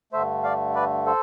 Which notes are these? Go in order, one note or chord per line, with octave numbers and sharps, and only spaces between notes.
G2 D3 A3 C5 E5
D5 F5
B4 D5
A4 C5